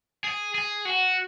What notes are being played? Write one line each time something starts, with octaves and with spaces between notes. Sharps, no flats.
G#4
G#4
F#4